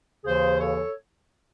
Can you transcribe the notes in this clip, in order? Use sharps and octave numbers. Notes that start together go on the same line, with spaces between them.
D#2 C#3 E3 G#4 C5
A4 C#5